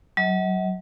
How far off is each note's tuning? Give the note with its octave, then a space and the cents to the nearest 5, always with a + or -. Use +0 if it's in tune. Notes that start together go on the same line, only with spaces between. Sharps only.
F#3 +15 D#5 +45